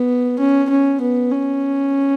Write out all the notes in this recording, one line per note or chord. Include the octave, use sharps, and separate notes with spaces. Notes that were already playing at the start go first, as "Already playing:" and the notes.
Already playing: B3
C#4
C#4
B3
C#4